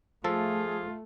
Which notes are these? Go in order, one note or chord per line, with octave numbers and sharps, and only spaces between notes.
F3 A3 F4 G#4 A4